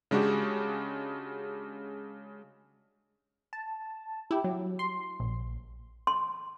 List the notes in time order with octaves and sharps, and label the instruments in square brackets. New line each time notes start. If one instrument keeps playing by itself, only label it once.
[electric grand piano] C#3 G#3 D4 F#4 G4
[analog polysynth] A5
E4 G4
F#3
C6
A#1
[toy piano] C6